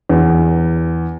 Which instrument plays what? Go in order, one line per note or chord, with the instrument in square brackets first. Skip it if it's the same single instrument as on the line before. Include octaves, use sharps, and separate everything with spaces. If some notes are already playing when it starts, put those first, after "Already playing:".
[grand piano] E2